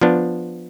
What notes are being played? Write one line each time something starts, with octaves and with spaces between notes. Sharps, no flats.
F3 B3 D4